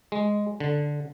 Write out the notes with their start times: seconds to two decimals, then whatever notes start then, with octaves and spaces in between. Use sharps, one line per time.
0.12 G#3
0.60 D3